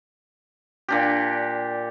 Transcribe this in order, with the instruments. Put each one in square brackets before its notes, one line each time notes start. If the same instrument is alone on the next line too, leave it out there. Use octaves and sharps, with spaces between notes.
[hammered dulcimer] A#2 D4 G4